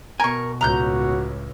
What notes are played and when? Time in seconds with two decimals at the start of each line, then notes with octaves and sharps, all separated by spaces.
0.20 B2 A#4 G#5 C#6
0.61 C#2 A2 F#4 A#5 F#6 G6